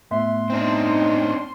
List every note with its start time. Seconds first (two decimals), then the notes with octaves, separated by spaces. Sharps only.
0.11 A2 B3 E5 C6
0.50 C4 D4 D#4